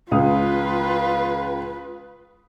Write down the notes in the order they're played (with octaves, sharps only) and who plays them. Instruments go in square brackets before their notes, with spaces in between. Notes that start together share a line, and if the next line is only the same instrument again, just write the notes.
[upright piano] C#2 F5 D#6 [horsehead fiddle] F4 B4